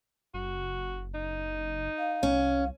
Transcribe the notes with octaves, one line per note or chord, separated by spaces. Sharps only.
F#1 F#4
D#4
F5
C2 C#4